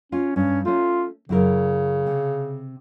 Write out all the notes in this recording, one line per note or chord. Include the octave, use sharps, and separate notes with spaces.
C#4 F4
G2 C#4
A3 C#4 F4
F#2 C#3 E4 A#4
C3